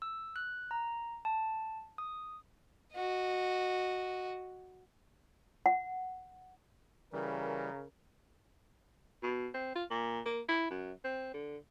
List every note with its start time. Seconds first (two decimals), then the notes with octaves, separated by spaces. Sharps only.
0.02 E6
0.36 F#6
0.71 A#5
1.25 A5
1.98 D#6
2.95 F#4 D#5
5.66 F#5
7.13 C#3 E3 G3 A#4
9.23 B2
9.54 C4
9.76 F4
9.90 A#2
10.26 A#3
10.49 E4
10.71 F#2
11.04 C4
11.34 D3